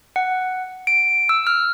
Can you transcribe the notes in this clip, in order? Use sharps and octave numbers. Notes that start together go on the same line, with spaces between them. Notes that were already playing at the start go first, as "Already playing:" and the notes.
F#5
D7
E6
F6